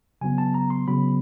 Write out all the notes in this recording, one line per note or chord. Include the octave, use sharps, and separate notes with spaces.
C#3 F#3 B3 G#5
A5
A#5
C6
C#3 F#3 B3 B5